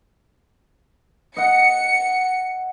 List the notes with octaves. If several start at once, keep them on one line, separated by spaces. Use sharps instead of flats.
D#5 F#5 C#7